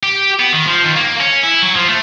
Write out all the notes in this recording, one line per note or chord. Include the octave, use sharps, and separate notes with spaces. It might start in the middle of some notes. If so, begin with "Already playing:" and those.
G4
B3
D#3
F3
D#2
A#3
C#4
E4
F#3
F3
A3